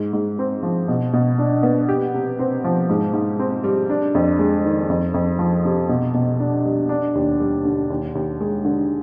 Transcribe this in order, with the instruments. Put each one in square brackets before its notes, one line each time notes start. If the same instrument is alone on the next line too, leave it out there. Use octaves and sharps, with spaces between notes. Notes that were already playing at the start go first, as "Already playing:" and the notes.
Already playing: [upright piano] G#2
G#2
C4
F3
B2
B2
D4
B3
G4
C3
C4
F3
G#2
G#2
C4
G3
D4
F2
G#3
D#3
F2
F2
F3
C3
B2
B2
D4
G3
D4
D#2
G3
D3
D#2
D#2
G#3
D3